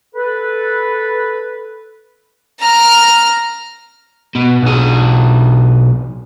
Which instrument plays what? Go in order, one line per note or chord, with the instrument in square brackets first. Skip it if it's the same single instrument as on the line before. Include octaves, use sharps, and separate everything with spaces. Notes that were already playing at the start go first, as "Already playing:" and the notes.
[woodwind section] A4 B4
[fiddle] A#5 F6
[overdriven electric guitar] B2
B1 G#4